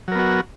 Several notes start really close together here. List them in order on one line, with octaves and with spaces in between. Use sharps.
F#3 A#4 B3 F#4